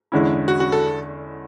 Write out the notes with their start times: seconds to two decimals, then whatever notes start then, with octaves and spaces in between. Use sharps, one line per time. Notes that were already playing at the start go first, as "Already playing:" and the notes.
0.12 E2 D3 G#3 C#4 E4
0.48 F#4
0.60 F#4
0.72 A4